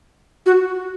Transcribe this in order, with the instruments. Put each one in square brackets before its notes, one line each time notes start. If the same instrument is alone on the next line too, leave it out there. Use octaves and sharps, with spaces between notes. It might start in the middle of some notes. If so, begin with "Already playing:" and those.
[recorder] F#4